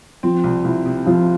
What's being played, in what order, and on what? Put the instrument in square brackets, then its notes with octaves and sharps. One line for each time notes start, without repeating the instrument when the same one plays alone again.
[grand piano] F3 F4 [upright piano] C4
[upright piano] C2
[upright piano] C2 [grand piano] E4
[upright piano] C3
[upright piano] C3 [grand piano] F3 F4